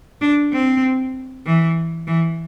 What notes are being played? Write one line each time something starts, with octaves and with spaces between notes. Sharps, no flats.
D4
C4
E3
E3